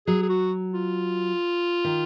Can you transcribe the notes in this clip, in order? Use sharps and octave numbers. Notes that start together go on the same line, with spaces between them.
F#3 G#4
G#4
F#4
F4
D#3